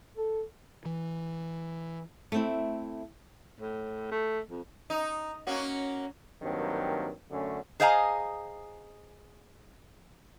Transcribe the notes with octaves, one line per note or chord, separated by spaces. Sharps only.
A4
E3
A3 C4 E4
A2
A3
F2
D#4
A#3 C#4 F#4
G2 D#3 F#3 A#3 C4
F#2 D3 A3 C#4
G#4 C5 D#5 F5 G#5 A#5